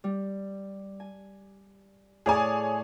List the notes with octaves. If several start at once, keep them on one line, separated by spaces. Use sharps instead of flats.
G3
G#5
A2 G#4 C#5 D5 G#5 D#6